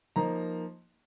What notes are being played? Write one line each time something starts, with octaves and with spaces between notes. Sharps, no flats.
F3 A#3 D#4 A#5